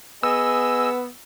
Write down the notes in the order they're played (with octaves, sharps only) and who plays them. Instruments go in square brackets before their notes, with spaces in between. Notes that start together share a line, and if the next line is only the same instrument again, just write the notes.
[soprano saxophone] B3 [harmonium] G#4 D#5 G#5 [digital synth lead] E6